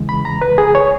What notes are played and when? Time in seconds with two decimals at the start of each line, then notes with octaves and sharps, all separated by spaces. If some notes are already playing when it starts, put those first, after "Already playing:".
Already playing: E2 C#3 E3 G#3
0.09 B5
0.25 A#5
0.42 B4
0.58 G#4
0.75 C#5